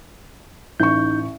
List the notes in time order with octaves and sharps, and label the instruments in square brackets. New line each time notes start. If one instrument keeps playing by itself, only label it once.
[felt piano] A1 C#6 [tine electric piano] D#4 G6